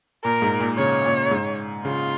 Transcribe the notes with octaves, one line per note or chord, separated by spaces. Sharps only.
A#2 A#4
G#2
A#2
C#3 C#5
A#2
G#2
C#3 F4